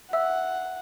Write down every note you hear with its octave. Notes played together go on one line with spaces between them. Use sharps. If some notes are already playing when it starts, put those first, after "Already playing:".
E5 F#5 E6